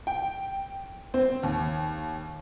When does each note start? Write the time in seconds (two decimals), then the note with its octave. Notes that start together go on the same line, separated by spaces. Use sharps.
0.07 G5
1.14 C4
1.43 D#2